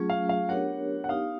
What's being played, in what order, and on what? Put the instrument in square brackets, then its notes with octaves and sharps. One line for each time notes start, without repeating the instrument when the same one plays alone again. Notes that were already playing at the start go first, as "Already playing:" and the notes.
Already playing: [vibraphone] F#3 A3 C#4 F4 G#4
[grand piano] F5
F5
[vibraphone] B3 D4 G4 A#4 C#5 [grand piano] F#5
[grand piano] F#5
[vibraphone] B3 D#4 G4 [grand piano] F5